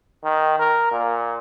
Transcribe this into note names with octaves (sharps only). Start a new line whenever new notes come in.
D#3
A#4
A#2